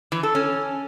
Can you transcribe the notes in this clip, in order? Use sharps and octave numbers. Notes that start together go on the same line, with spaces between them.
E3
A4
C#4